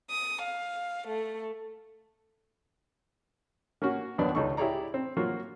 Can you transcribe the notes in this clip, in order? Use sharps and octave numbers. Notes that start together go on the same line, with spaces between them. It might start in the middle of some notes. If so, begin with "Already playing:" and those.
D#6
F5
A3
A#3 C#4 F#4
D#2 D#3 F#3 B3 D4 D5
C#2 D#4 A4 C#6
E4 G4 G#4 C#5 D5 A#5
C4
F#3 A#3 F4 F#4